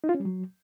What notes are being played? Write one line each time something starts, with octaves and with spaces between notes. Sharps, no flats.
D#4
F4
C#4
G3
F#3